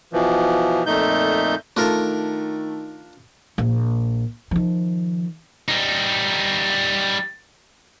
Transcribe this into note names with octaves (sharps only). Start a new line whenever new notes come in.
B2 E3 F3
F2 A#2 A3 D#4 G6
D#3 A3 D4 F4 A#4
A#1
D#3 F3
G3 D#4